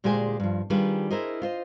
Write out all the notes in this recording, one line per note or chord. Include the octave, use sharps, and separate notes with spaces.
D2 A#2 G#3 G4 G#4 C5
G2 F3
D#3 G3 D4 F4 G#4 B4
E4 G#4 A#4 C5 D#5
F4 C5 D#5